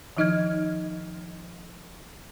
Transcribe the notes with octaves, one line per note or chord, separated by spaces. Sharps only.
D#3 F3 D#4 D#5 F6 G#6